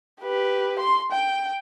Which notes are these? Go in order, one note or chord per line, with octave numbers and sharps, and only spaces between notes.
G4 B4
C6
G5